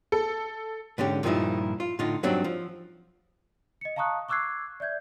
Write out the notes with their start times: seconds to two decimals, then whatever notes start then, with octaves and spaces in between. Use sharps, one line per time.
0.12 A4
0.98 G#2 D3 C#4 G4
1.23 G2 A#2 D#3 F3 D#4 E4
1.80 F4
1.99 A2 D3 D#4 F4
2.23 G2 F#3 C4 D4 D#4
2.44 F3
3.81 D#5 C#7
3.96 F5 A5 A#5 C#6 D#6 F#6
4.29 C#6 D6 E6 F#6 G#6 C7
4.80 D5 E5 G6 G#6